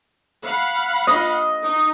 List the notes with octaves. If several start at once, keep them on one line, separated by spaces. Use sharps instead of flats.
F5 F#5 B5
D#5
D#4